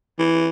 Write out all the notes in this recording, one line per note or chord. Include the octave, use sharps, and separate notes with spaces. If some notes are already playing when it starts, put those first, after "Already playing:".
E3